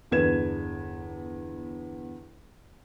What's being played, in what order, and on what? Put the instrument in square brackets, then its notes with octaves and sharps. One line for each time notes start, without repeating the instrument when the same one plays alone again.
[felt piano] G1 E2 D3 B4 G#6 E7